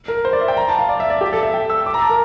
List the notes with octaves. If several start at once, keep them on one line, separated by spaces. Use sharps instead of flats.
A#4
C5
D5
E5
G5
A#5
A5
F5
D5
E5
D5
G4
A4
E5
G5
E6
D6
A#5
A5
A#4